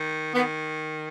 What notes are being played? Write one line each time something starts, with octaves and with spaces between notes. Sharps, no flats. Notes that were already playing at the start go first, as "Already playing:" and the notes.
Already playing: D#3
D#3 B3